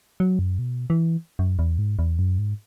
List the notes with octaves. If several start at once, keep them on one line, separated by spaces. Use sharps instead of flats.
F#3
F#2
B2
E3
F#2
E2
G#2
E2
F#2
G#2